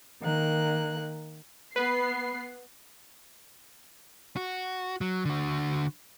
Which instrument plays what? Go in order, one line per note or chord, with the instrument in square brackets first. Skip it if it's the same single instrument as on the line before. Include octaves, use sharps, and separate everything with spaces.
[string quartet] D#3 A#3 F#6
[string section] B3 C7 [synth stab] B4
[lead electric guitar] F#4
F#3
D3 F#4